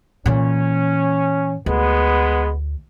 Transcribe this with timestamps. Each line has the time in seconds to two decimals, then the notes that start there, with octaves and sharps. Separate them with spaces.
0.26 A#2 E3 C#4
1.66 D2 G#3 B3